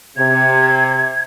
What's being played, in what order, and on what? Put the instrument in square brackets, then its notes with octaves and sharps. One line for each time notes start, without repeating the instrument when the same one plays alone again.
[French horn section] C3 [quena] G#6